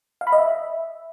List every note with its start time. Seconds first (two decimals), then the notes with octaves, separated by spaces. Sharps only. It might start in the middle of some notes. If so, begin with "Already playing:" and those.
0.21 F5
0.27 B5
0.32 D#5
0.38 E5